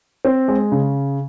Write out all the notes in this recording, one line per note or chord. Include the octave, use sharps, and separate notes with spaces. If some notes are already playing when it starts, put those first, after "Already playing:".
C4
G#3
C#3